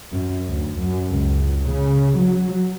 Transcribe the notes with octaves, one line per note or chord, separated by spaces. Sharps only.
F#2
D2
F#2
C#2
C#3
F#3